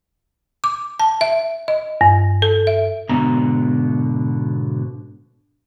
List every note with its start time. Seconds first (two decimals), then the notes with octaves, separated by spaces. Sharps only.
0.64 D6
1.00 A5
1.21 E5
1.68 D#5
2.01 G2
2.42 A4
2.67 E5
3.09 G#2 B2 D3 A#5